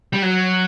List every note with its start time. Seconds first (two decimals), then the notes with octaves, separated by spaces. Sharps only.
0.14 G3
0.23 F#3